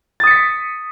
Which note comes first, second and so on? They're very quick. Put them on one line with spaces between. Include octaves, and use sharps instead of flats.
A6 D#6 C#7 B6